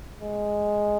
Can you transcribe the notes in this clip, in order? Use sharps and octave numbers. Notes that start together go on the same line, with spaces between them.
G#3